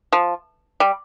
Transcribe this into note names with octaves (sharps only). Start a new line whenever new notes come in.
F3
G3